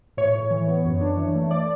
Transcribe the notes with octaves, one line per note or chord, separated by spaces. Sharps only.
A2 C#5
A2
E3
B3
F#2
D4
E3
A3
D5